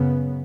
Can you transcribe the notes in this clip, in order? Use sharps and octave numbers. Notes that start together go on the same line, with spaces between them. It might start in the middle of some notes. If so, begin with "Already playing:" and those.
Already playing: F#2 C#3 B3